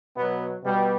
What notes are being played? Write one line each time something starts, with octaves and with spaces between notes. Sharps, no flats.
B2 F#3 B3
B2 G3